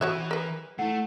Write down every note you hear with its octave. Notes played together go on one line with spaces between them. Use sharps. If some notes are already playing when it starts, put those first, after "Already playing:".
E3 F#4 C#5 E5 F#6
A#4 B4
A3 E4 F#5